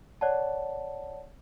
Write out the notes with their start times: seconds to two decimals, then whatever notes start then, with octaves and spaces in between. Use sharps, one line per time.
0.21 C#5 D5 F#5 A5